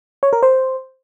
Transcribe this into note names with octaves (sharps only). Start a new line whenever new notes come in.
C#5
A#4
C5